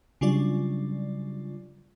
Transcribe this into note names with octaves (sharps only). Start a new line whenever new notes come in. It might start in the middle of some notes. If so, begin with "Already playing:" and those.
C#3 F#3 G3 D4 F4 D5